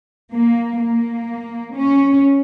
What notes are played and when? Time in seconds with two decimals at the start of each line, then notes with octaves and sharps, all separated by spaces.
0.33 A#3
0.81 A#3
1.75 C#4